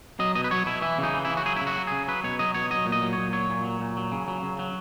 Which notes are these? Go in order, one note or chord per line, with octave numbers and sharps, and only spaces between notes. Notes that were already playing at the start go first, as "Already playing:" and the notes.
F#3 D#5
B2 D#5
B4
F#3 C#5
B2 E4
E3 E4
C#3 D#4
E3
E4
C#3
F#4
F#3 G#4
E4
C#3
F#4
F#3
C#3 G#4
F#3 B4
B2 C#5
F#3 D#5
B2 C#5
F#3 D#5
A#2
D#5
F#3
A#2 C#5
F#3 C#5
A#2
F#3
A#2
F#3
C#3
F#3
C#3
F#3